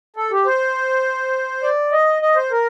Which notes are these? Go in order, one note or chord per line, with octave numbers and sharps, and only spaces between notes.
A4
G4
C5
D5
D#5
D#5
C5
A#4